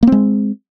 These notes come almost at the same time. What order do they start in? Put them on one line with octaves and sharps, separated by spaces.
A#3 C4 G#3